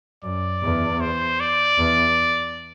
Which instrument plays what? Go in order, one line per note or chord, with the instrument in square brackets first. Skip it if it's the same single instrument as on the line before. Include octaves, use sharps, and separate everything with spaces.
[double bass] F#2 [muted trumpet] D5
[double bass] E2
[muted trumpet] C5
D5
[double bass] E2